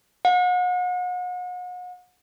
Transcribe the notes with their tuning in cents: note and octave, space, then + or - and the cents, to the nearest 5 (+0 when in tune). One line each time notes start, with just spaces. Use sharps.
F#5 -40